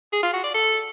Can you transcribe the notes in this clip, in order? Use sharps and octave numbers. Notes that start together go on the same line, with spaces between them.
G#4
F4
F#4
D5
A4